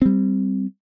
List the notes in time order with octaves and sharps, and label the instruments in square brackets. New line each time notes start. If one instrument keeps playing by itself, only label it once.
[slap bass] G3 C4